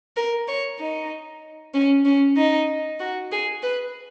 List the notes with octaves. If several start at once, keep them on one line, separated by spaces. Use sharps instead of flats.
A#4
C#5
D#4
C#4
C#4
D#4
F#4
G#4
B4